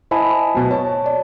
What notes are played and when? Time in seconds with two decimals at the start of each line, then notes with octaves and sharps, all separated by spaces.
0.11 E4 C5 D#5 G#5 A5 B5
0.54 B2 F#3
0.71 C#5 A5
1.06 D5